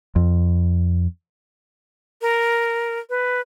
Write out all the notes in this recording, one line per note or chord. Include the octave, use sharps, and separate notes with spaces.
F2
A#4
B4